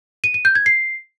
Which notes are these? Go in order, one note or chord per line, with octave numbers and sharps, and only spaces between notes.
D#7
D#7
G6
G#6
C7